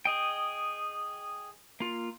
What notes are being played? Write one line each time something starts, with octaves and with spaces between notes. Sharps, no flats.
G#4 D#5 G5
A#3 F4